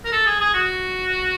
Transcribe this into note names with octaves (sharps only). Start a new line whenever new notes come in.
A#4
A4
G#4
G#4
F#4